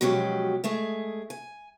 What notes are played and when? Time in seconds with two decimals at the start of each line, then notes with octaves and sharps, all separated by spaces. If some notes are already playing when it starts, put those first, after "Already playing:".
0.01 B2 F3 F#3 G#3 C#4 G4
0.64 G#3 A3 G#4
1.30 G#5